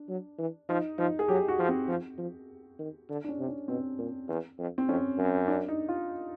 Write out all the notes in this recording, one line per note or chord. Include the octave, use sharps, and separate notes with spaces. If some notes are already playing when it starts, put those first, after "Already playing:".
Already playing: D4
F#3
E3
F3 D#4
F3 D#4
G#4
F#3 G4
F#4
F3
C4
F3
F3
D#3
D3
D4
C#4
C3
C#4
B2 C4
A#2
E2
F2
C4
F2 C#4
F#2
D4
D#4
F4